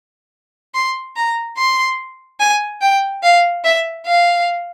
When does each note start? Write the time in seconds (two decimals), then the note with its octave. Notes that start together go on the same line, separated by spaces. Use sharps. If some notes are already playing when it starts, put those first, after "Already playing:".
0.74 C6
1.16 A#5
1.58 C6
2.40 G#5
2.81 G5
3.23 F5
3.64 E5
4.05 F5